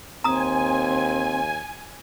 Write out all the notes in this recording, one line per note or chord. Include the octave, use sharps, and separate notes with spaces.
D#2 C4 G#5 A#5 D#6